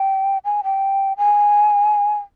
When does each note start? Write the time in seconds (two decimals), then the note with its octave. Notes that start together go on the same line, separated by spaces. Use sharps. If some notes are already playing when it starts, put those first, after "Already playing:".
Already playing: G5
0.45 G#5
0.64 G5
1.18 G#5